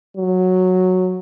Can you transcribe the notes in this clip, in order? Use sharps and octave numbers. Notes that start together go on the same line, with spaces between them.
F#3